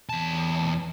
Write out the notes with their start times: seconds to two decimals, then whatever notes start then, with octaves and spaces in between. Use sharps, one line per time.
0.09 E2 A5